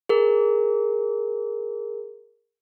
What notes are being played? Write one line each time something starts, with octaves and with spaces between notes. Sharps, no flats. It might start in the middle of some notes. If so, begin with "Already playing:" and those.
G#4 A#4